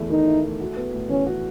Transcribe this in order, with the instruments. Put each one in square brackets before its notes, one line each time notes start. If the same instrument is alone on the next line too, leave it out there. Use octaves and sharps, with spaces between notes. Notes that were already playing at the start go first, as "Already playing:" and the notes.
Already playing: [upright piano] E2 A3 E4
[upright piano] D#3 [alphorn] D#4
[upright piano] E4
A3
F#4
B3
A2
[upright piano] E3 [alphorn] C#4
[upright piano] F#4